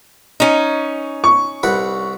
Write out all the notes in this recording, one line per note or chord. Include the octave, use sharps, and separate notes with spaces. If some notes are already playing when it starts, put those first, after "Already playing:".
C#4 D#4
C#6
C2 B4 F#5